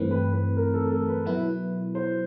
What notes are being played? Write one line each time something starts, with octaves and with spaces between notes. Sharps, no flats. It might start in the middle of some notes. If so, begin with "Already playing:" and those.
Already playing: G2 E3 A3 C4 B4
B4
B4
A#4
A4
A4
B4
B2 F#3 B3 E4 B4
C5